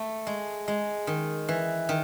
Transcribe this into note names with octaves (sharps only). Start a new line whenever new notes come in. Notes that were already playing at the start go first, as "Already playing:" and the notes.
Already playing: A3
G#3
G#3
D#3
E3
D#3